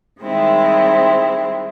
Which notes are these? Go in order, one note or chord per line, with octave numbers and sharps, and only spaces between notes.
D#3 G3 G#3 C4 E4